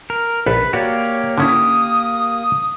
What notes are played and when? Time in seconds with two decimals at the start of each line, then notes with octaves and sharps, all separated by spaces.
0.10 A#4
0.46 A#1 A4 B4 B5
0.73 A#3 F#4 G4 C#5 D5
1.38 D3 C#4 E4 D#6